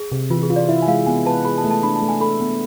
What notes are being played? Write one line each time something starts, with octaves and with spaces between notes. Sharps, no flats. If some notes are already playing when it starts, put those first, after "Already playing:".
Already playing: G#4
C3
E3 F4
G#4
F4
D5
E4 E5
G#5
G#3 F5
B3 G#5
B4 A5
G#4 B5
A5
A3
A5
D4 B5
A5
A3
G#5
A4 B5
B3